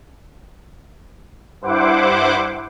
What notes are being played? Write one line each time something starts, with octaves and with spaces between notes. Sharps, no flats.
G2 E4 C5 F#5 D6